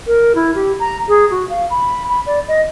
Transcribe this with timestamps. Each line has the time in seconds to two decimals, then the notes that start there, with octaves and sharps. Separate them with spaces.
0.07 A#4
0.35 E4
0.55 G4
0.80 A#5
1.08 G#4
1.31 F#4
1.50 F5
1.70 B5
2.09 B5
2.26 D5
2.48 D#5